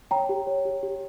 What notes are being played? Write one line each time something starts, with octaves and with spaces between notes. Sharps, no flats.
C#5 G5 A#5
G4
C#5
G4
G4